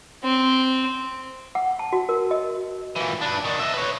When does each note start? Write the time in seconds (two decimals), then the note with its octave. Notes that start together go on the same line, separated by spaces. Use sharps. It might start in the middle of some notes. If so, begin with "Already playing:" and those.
0.24 C4
1.55 F#5
1.79 A5
1.93 F#4
2.09 A#4
2.31 D#5
2.96 A#2 E3
3.21 D4 B4
3.45 D#3 D4
3.59 D#5 E5
3.73 B4 C#5